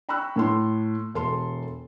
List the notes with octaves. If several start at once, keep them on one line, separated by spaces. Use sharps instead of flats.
G5 A#5 B5 C#6 E6 F#6
A2 A4 C6
E1 A4 C6